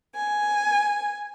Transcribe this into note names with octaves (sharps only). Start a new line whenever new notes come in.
G#5